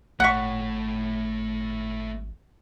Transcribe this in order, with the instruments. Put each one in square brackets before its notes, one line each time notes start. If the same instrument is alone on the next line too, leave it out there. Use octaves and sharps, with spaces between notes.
[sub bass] G#1 [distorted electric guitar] A3 C#5 [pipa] F#5 C#6 [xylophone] F#6 B6